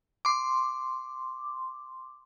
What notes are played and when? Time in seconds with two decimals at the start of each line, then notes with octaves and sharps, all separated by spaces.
0.25 C6 D6